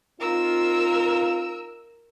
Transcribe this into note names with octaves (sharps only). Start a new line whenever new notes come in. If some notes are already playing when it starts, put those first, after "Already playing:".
C4 D#4 F4 A#4 E6